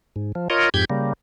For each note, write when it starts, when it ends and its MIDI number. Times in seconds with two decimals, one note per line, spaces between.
0.16 0.32 44
0.35 0.48 53
0.50 0.69 65
0.50 0.69 70
0.50 0.69 73
0.50 0.69 75
0.74 0.85 41
0.74 0.85 44
0.74 0.85 67
0.74 0.85 91
0.74 0.85 92
0.90 1.13 49
0.90 1.13 55
0.90 1.13 58